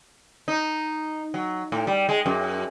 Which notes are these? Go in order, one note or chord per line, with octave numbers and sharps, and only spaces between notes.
D#4
F#3
A2
G3
G#3
F#2